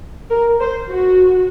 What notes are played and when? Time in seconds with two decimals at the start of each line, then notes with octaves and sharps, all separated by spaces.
0.30 A#4
0.60 C5
0.88 F#4